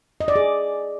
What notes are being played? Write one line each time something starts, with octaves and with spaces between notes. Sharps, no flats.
D#5
D5
G#4